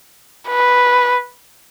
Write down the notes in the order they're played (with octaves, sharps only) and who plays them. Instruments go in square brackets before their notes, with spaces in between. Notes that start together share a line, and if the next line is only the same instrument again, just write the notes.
[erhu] B4